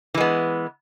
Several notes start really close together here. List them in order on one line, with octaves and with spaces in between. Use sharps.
E3 G#3 B3